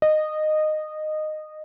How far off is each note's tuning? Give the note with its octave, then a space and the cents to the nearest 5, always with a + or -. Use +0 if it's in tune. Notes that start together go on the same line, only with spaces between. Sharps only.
D#5 -15